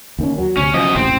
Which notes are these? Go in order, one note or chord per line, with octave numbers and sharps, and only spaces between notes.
D#2 D#3 C#4
F#3
D2 C3 C#4
F#2 F3 D#5
E1 A1 C3 C4